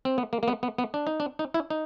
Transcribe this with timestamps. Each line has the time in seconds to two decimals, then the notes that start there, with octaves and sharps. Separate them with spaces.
0.05 C4
0.18 B3
0.33 A#3
0.43 A#3
0.48 B3
0.63 B3
0.78 B3
0.94 D4
1.07 D#4
1.20 D4
1.39 D#4
1.54 E4
1.70 D#4